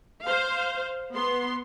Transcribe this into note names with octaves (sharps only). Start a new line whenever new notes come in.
C5 F5
B3 C6